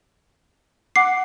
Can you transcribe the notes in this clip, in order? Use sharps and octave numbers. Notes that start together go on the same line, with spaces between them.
F#5 D6 C7